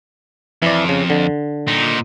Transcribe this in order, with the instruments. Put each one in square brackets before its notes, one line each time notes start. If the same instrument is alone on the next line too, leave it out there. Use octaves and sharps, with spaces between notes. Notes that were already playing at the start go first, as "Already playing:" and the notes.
[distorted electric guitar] F2 [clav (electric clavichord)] E3 D5
[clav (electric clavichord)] C#3
D3
[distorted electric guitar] A#2 D#4